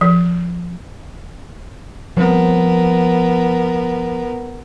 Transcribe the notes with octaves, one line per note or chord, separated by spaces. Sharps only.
F3
F3 G3 B3 C4 A#4